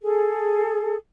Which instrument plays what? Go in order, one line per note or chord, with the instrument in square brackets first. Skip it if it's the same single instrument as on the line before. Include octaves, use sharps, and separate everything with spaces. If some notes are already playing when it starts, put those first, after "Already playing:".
[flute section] G#4 A4